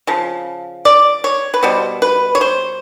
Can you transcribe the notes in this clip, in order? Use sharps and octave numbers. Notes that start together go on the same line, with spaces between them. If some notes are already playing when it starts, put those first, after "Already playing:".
C#3 F3
D5
C#5
B4
B2 G3 B3 C5
B4
C#5
C5